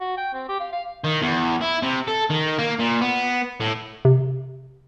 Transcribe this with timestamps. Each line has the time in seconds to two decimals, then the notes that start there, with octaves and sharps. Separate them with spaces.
0.01 F#4
0.17 G5
0.33 C4
0.48 G4
0.60 F5
0.72 F5
1.04 D#3
1.22 E2
1.61 E4
1.82 C3
2.08 A4
2.30 D#3
2.59 A#3
2.79 A#2
3.01 B3
3.60 A2
4.05 C3